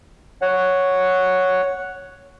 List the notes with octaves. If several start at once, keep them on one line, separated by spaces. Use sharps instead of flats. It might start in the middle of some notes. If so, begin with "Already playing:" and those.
C#5 F#5